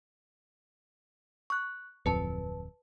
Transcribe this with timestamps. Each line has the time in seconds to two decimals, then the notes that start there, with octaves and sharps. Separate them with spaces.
1.50 C#6 F#6
2.06 D1 F2 B4 A5